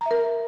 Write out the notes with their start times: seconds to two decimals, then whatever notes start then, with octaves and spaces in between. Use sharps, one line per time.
0.01 A#5
0.06 E5
0.11 A#4